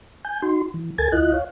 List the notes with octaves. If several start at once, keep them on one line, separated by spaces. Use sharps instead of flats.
G#5 G6
D#4 F#4 C6
E3
D2 A4 A#4 G#5 G#6 A6
D2 E4 F4 D#5 F#6
C#5 F5